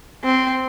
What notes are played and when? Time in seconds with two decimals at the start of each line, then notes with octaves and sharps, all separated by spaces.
0.24 C4